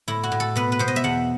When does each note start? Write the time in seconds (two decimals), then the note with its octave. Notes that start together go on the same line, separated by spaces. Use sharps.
0.08 A2 E4
0.23 F#4
0.32 A2
0.40 A4
0.56 B2 B4
0.72 B4
0.79 B2 C5
0.88 D#5
0.96 E5
1.04 E2 F#5